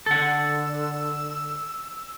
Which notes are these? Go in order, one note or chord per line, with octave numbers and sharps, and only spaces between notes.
D3 A4 F#5 E6